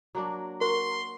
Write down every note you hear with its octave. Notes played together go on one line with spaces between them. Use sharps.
F#3 A#3 D4
F#4 A#4 C6